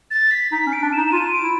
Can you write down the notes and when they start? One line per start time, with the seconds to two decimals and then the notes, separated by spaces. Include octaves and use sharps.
0.11 A6
0.31 B6
0.52 D#4 B6
0.67 C#4
0.73 D7
0.82 D4
0.93 D#4 E7
1.08 E7
1.12 F4 D#7
1.32 D7
1.43 E4